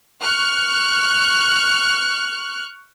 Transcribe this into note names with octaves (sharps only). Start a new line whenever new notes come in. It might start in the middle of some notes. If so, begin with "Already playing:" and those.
C#6 F6 F#6